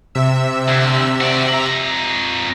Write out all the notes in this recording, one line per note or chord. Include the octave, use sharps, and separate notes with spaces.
C3 E5 E6
D2
F#4 D5
F2 A#5